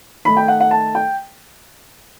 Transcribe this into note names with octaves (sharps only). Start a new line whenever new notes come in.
D#3 A3 D#4 B5
G5
F#5
F#5
A5
G5